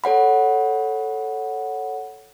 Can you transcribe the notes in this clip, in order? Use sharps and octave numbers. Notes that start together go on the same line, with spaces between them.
A4 C#5 F#5 B5